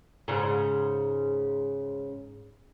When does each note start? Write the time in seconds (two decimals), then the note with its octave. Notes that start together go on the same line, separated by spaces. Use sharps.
0.28 G#2 C#3